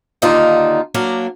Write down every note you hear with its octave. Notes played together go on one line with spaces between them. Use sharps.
D#2 D3 A#3 D4 D#4 F4
F#3 A#3 D4 A#4